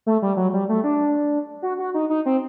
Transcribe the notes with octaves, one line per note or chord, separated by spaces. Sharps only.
A3
G3
F#3
G3
A3
D4
F#4
F#4
D#4
D#4
C4